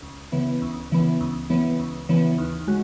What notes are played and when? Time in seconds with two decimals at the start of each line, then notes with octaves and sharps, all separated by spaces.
0.02 C#2
0.32 C#3 E3 B3
0.62 C#2
0.91 C#3 E3 B3
1.20 C#2
1.50 C#3 E3 B3
1.79 C#2
2.09 C#3 E3 B3
2.38 D#2
2.67 C#3 G#3 F#4